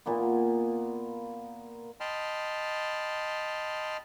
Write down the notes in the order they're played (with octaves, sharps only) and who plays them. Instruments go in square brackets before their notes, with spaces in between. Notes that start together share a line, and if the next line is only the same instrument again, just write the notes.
[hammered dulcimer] A#2 A#3 B3
[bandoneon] D#5 G5 A5 B5 C6 F6